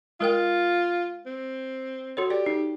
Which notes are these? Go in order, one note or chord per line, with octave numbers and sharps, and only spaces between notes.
G#3 F4 A#4 G5
C4
F#4 A4 C#5
G4 D5
D#4